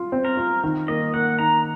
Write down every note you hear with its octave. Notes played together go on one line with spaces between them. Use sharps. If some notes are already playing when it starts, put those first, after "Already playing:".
Already playing: F4
C4
A#4
F4
D#3
A#3 D#5
A#3 F#5
D#3 A#5